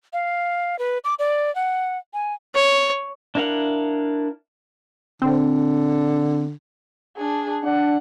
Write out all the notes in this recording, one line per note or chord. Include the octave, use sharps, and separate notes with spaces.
F5
B4
D6
D5
F#5
G#5
C#5
D4 E4 A#4 F5 F#5
D3 C4
D4 G#4
D4 F#5